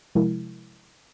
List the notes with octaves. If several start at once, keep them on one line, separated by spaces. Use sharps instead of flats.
C3 F3 G#3 E4 A#4